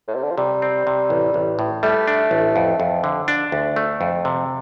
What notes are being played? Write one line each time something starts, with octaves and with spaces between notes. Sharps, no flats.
A2
C3
D3
F3
C3 G3
C4
C3
A1
A1
A2
G3 A3
D4
A1
F2
F2
D3
D4
D2
A3
F2
C3